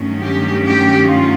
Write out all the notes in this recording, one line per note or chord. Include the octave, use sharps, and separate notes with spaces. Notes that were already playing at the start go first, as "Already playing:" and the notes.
Already playing: G2 D#3 F#3 A3 C#4
G4
G4
F4